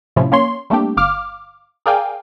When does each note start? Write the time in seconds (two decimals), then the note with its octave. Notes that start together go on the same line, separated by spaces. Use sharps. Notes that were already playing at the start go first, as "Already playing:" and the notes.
0.16 A2 C3 F3 C#4 E4
0.32 A#3 C#4 C#5 C6
0.70 G3 A3 A#3 C4 D4 G4
0.97 G1 F5 D6 F6
1.86 G#4 A#4 D5 F5 G5 G#5